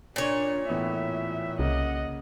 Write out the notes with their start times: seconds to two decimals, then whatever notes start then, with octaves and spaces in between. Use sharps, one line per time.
0.16 A#2 D4 C#5
0.69 A2 E3 B3 E5
1.59 C2 C#3 A#3 D#5 F#5